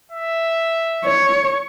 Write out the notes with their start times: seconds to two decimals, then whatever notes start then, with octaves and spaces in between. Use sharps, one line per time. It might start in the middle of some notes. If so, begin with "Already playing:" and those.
0.12 E5
1.04 C#5